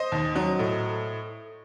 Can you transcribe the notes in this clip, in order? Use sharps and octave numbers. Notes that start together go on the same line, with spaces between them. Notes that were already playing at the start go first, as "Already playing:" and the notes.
Already playing: C5 D#5
D#2
F#3
A2